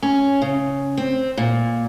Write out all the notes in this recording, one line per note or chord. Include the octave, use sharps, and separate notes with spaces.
C#4
C#3
C4
A#2